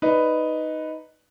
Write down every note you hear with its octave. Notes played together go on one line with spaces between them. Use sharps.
D#4 B4 D5